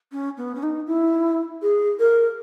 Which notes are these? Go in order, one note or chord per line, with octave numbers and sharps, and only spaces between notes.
C#4
B3
C#4
D#4
E4
G#4
A#4